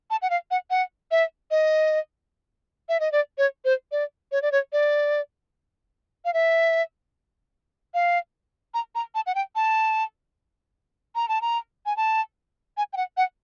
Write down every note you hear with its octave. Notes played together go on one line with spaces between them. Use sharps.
A5
F#5
F5
F#5
F#5
E5
D#5
E5
D#5
D5
C#5
C5
D5
C#5
D5
C#5
D5
F5
E5
F5
A#5
A#5
A5
F#5
G5
A5
A#5
A5
A#5
G#5
A5
G#5
G5
F#5
F#5